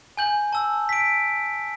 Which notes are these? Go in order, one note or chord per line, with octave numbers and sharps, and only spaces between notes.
G#5 G6 F#7
A5 E6
B6 D7